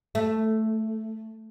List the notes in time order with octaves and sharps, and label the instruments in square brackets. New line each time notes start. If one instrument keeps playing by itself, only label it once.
[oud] A3